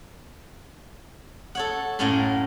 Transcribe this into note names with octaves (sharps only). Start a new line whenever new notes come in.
A4 C#5 F#5
F#2 A2 A#3 C#4 F#5 C6